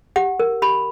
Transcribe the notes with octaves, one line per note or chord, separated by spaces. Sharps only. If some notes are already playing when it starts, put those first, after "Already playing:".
G4 F#5
A#4
G4 B5